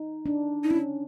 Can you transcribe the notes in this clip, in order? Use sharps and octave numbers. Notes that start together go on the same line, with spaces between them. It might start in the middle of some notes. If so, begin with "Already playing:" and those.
Already playing: D#4
D4
D#4
C#4 E4